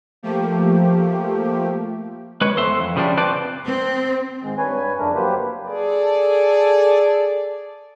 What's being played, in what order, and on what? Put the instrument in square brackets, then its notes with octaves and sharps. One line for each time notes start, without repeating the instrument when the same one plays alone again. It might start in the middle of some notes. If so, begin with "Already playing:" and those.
[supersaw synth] F3 A3 A#3 G4
[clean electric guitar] G#3 B4 C#5
E2 A4 C5 E5 C6
F2
C#3 F3 G3 C#4 D4
C4 B4 C5 D5 A5
[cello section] C4
[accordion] G#2 D#3 G#3
G2 B4 C#5 G#5
F2 C#3 A3 D4 A#4
F#3 A#3 G4 B4 C5
[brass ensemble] G#4 A4 D5